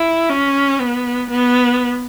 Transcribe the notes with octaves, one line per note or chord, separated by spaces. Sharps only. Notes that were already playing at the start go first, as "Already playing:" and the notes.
Already playing: E4
C#4
B3
B3